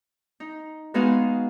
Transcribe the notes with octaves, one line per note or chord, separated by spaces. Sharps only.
D#4
G#3 B3 D#4 F#4 G#4 F5